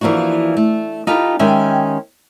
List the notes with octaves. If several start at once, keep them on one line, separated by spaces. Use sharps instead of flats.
E3 F3 A#3 D4 F#4
A3
D#4 F4 G4 A4 B4
D#3 G#3 C#4 G4 E5 G5